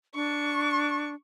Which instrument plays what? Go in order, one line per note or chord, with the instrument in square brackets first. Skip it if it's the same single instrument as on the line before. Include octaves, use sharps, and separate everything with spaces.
[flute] D4 [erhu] C#6